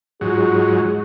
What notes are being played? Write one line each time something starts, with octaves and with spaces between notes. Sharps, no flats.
G#2 F#3 G#3 F4 G#4 C#6